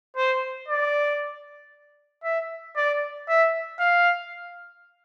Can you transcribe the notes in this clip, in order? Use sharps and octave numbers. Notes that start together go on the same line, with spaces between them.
C5
D5
E5
D5
E5
F5